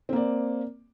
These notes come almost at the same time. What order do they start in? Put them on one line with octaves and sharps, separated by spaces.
C4 A#3 D5